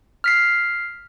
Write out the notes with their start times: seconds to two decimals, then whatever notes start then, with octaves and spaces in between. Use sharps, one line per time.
0.24 F6 B6 C7